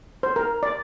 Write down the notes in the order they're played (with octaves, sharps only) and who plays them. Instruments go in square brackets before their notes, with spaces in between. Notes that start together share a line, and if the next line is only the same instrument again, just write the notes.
[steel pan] C5
A#4
D5